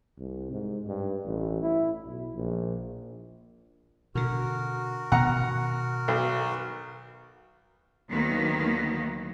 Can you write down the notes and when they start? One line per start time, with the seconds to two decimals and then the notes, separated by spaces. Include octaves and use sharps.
0.19 C2
0.51 G#2
0.87 G2
1.25 A1
1.62 E4
2.05 B1
2.35 A#1
4.15 B2 D3 F#4 A#4
5.12 B2 D#3 B3 F#5 A#5
6.08 B1
8.08 D2 D#3 F#3 A#3 B3